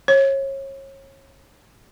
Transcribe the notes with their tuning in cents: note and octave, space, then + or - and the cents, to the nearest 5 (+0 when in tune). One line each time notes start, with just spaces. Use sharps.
C#5 -30